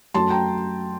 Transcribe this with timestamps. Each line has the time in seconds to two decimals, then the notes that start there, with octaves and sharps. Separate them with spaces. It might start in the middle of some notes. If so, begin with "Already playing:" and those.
0.14 F#2 F#3 A3 A5 C6
0.30 G5 A#5